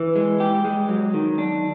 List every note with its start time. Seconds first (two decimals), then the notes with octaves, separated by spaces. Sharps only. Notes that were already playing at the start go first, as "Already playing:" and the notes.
Already playing: E3
0.16 G#3
0.40 G4
0.65 G#3
0.89 F#3
1.14 D#3
1.38 D4